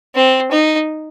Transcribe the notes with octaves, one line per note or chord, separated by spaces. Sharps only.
C4
D#4